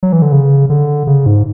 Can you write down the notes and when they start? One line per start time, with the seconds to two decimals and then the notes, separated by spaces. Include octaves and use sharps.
0.03 F#3
0.12 E3
0.22 D3
0.32 C#3
0.70 D3
1.07 C#3
1.26 G#2